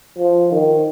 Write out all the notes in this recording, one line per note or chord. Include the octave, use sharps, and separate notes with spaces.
F3
D#3